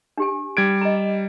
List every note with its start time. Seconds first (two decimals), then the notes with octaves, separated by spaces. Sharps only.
0.17 D4 G4 G#5
0.57 G3 G#6 D7
0.81 D#5 A#5